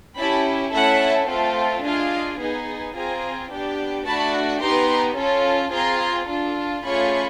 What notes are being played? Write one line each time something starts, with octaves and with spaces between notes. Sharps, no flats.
C#4 E4 G4 A5 B5
A3 C#4 E4 A4 E5 F#5
A3 C4 F4 A4
D4 F4 G#4 D#5 F5
B3 D#4 G#4
C4 F4 G#4 G#5 A#5
B3 D4 G4
A3 D4 F#4 A5 B5
B3 D#4 G4 A#5 C6
C#4 F4 A4
C4 F4 G#4 A#5 C6
D4 F4 A4
A3 C#4 F4 G#4 B5 C#6